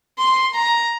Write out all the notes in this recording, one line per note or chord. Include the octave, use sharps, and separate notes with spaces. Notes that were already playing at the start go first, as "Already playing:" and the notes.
C6
A#5